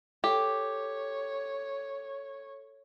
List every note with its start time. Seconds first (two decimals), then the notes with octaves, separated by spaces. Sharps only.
0.24 G4 A4 C#5